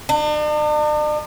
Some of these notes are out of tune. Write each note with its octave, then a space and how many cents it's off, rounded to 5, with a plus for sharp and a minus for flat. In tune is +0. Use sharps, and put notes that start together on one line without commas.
D4 +45